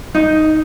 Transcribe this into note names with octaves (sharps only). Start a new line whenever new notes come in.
D#4